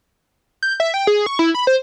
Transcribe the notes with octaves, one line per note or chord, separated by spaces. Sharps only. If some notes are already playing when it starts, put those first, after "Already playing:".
G6
E5
G5
G#4
C#6
E4
B5
C5